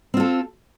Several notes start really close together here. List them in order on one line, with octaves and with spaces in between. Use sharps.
C4 F4 A4